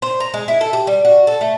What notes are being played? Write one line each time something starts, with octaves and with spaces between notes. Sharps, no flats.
C5
A#5
G#3
E4
A4
G4
G3
F#4
A4
A3